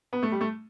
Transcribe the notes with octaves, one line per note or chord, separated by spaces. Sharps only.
B3
A3
G3
A3